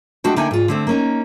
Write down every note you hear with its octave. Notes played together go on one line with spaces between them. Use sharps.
G#3 D4 F#4 G5
D3 A#3 D#4 E5 G5 G#5
G#2 F4
D3 A3 C4
A#3 C#4 D#4